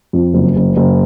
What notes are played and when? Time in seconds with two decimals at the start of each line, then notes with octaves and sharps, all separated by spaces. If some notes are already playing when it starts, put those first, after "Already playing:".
0.13 F2
0.34 F#1
0.56 F#1
0.77 F#1